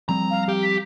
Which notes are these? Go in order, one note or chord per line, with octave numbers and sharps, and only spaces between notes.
F3 G3 C4 A#5
F5
G4
B6